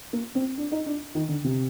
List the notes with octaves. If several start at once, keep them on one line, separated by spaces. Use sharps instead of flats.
A#3
C4
D4
D#4
D4
D#3
D3
C3